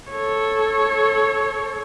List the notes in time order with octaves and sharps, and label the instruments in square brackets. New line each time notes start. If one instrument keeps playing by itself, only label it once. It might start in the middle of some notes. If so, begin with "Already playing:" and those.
[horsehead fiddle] A4 C#5